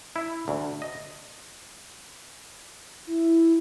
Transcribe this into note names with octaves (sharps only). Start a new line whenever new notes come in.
E4
D2
D#5
E4